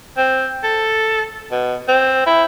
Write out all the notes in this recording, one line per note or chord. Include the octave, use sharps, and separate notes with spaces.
C4
A4
B2
C4
E4